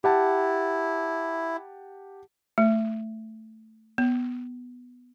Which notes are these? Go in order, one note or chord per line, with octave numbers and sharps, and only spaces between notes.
E4 G4 F#5 A5
A3
B3